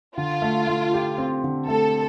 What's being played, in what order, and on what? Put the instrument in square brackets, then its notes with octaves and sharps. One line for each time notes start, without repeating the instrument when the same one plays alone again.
[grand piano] D3 [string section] F4
[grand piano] A3
A3
G4
C4
D3
[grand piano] A3 [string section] A4